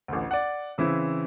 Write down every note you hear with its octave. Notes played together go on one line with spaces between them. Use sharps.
A1 D2
D5 F#5
C#3 E3 C4 E4